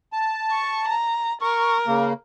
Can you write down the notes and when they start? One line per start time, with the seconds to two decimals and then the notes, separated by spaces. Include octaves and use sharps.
0.13 A5
0.52 C#6
0.88 A#5
1.41 A#4 C#6
1.87 C#3 A#3